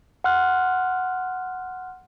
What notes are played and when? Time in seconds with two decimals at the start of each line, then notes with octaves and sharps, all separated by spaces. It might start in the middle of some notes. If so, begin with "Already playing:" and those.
0.24 F#5 C6 F6 F#6